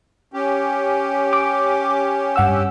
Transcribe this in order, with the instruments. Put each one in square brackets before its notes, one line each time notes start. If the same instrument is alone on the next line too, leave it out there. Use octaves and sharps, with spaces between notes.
[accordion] C#4 G4
[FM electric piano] D6
G2 F#5 E6